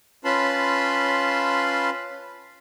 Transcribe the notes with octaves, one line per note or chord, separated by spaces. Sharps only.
C#4 F4 B4 A5 B5 C6